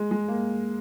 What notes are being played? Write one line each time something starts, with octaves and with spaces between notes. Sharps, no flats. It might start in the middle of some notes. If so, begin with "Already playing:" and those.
Already playing: G#3
G#3
A#3